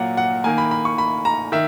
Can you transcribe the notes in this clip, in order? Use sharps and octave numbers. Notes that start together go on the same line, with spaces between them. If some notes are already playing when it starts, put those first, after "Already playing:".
Already playing: A#2 F#3 A#3 F#5
F#5
D#3 A#3 G#5
B5
B5
C#6
B5
A#5
D#3 E5